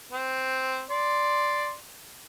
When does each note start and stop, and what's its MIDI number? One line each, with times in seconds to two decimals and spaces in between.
0.12 0.83 60
0.91 1.73 74
0.91 1.73 84